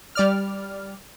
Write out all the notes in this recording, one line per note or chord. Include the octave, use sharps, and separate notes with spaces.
G3 D5 F6